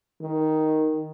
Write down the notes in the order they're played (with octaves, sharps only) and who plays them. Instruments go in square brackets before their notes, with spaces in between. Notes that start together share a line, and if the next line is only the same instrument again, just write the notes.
[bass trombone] D#3